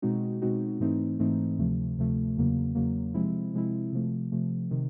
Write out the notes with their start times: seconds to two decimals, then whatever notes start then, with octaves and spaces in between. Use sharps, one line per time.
0.02 B2 G#3 C4 D#4 F#4
0.42 B2 G#3 C4 D#4 F#4
0.80 G#2 E3 A3 C4 D#4
1.19 G#2 E3 A3 C4 D#4
1.59 D2 C3 F3 A3
1.98 D2 C3 F3 A3
2.37 E2 C#3 F#3 A#3
2.75 E2 C#3 F#3 A#3
3.14 C3 F3 G#3 C4 E4
3.53 C3 F3 G#3 C4 E4
3.92 C3 F3 A3
4.32 C3 F3 A3
4.71 C3 D#3